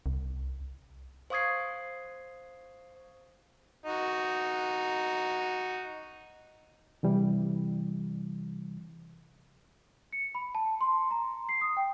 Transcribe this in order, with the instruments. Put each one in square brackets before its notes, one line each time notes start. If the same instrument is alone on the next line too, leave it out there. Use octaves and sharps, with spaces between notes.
[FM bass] C2
[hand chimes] C5 F5 C#6 D#6 G#6 C7
[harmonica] D#4 F#4
[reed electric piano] C3 E3 G3
[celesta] C#7
B5
A5
C6
A#5
C7
D#6
G5